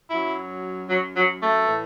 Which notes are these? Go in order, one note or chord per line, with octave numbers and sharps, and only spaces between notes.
F#2 F#3 E4
F#3
F#3
A3
A2 E3